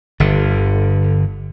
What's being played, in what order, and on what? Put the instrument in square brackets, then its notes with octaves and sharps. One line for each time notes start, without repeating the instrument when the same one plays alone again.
[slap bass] G1 D3